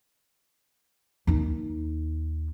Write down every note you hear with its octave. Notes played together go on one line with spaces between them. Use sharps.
D#2 D#4